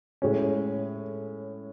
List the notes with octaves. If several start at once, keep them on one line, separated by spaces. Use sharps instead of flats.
A2 G#3 C#4